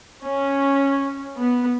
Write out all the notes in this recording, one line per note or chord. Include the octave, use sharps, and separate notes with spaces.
C#4
B3